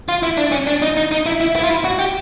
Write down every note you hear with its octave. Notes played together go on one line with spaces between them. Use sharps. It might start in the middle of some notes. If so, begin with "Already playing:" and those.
F4
E4
D4
C#4
D4
D#4
D#4
D#4
E4
E4
E4
F4
E4
F#4
G4